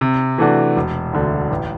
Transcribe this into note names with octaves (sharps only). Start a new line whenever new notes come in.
C3
E3 A3 D4 F#4
E1
D2 D3 A3
A1